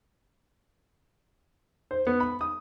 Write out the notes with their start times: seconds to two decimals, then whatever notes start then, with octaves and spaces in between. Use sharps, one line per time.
1.91 C5
2.07 B3
2.20 B5
2.41 D#6